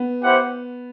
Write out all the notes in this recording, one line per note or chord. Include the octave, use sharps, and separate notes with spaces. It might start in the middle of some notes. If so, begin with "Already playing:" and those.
Already playing: B3
E4 G4 C5 F#5